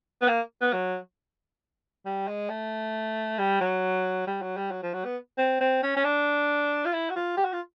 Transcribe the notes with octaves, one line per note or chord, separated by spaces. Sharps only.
B3
A#3
B3
F#3
G3
G#3
A3
G3
F#3
G3
F#3
G3
F#3
F3
F#3
B3
C4
C4
C#4
C#4
D4
F4
E4
F#4
F4
G4
F#4
F4